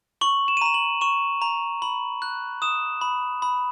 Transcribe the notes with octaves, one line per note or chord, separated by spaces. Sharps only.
C#6 F#7
E7
D#7
A#5 E7
F#7
C#6 E7
A#5
B5 F#7
F#6
D#6 E7
B5
B5